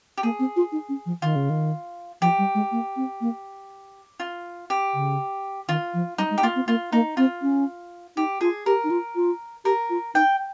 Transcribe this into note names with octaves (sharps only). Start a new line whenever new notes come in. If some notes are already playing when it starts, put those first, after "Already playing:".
G4
A#3 G#4
C4
F4
D#4
C#4
F3
D#3 F4
C#3
D#3
F3 G4
G3
G#3
A#3
C4
A#3
F4
G4
C#3
D#3 F4
F3
G3 D#4
G#3
G4
A#3 F4
C4
A#3 F4
A#3 D#4
C4 F4
C#4
D#4 G4
F4 G#4
G4 A#4
D#4
F4
F4
G4 A#4
F4
D#4 G5